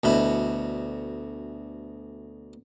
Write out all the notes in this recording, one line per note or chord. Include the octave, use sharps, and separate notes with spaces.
D2 B2 E4